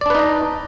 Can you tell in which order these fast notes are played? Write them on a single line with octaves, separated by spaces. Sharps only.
D5 D4 B4 D#4 D#5